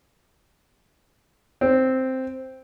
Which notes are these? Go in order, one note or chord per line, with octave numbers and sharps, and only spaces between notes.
C4